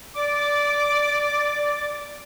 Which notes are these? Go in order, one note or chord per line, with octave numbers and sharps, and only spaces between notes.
D5 D6